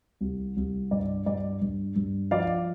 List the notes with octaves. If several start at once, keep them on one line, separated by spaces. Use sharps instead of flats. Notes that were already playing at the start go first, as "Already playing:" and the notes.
C2
C2
G2 D5
G2 D5
G2
G2
F3 D5 F5